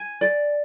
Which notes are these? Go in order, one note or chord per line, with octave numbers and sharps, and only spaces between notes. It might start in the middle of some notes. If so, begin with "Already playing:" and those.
Already playing: G#5
D5